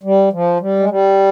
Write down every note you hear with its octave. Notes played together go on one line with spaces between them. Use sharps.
G3
F3
G3
G#3
G3